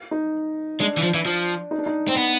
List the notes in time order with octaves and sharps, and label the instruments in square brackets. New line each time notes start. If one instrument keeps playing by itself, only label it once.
[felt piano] D#4
[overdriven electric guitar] G#3 [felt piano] D4
[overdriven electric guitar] E3
F3
E3
F3
[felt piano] D#4
D4
D#4
[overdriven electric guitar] C4
B3